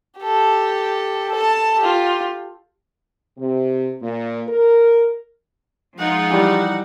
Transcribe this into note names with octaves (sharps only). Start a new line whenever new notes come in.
G4 A4
A4 A5
F4 G4
C3
A#2
A#4
F3 G#3 D#4 F4 F#5
E3 G3 G4